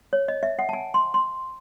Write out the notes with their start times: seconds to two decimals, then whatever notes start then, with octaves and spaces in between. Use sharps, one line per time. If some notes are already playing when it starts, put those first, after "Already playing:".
0.13 C#5
0.28 D#5
0.43 E5
0.59 F#5
0.69 A5
0.73 G#5
0.94 C6
1.14 C6